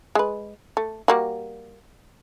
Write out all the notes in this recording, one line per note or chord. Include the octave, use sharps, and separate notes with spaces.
G#3 B4
A3
G3 A#3 F#4